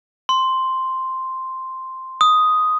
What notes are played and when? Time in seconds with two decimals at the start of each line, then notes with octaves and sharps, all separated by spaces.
0.29 C6
2.21 D#6